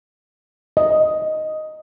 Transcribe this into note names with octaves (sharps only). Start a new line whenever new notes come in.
D#5